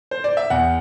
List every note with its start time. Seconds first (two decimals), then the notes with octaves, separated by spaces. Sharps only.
0.11 C5
0.24 D5
0.37 E5
0.50 E2 F#5